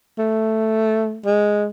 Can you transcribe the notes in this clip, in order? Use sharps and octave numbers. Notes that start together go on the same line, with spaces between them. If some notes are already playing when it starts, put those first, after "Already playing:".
A3
G#3